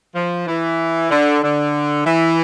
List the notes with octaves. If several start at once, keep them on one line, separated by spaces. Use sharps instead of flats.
F3
E3
D3
D3
E3